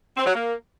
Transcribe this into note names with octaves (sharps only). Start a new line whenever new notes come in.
C4
F#3
A#3